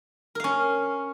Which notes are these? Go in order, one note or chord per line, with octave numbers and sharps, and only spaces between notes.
C#4 A#4 F5